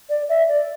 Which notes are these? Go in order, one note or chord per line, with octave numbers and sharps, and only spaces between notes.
D5
E5
D5